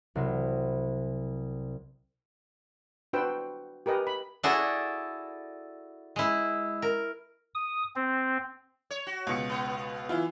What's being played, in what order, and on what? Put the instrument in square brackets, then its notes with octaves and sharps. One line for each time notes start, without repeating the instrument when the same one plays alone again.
[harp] C2 F#3 C5
[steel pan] D4 F#4 B4 C5 G5 E6
G4 A#4 B4 D#5 G#5
B5
[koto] D4 E4 F#4 G#4 A4
G#3 E4
A#4
[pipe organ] D#6
C4
[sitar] C#5
F#4
[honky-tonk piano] C#2 B2 C#7
[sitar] B3
[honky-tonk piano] E3 E4 F4